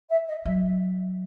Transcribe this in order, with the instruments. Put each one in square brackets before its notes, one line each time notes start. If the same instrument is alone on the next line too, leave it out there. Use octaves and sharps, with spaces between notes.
[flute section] E5
D#5
[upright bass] F#3 [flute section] E5